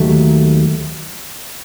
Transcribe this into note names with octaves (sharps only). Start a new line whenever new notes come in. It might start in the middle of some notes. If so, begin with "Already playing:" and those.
Already playing: D#2 D#3 F#3 A3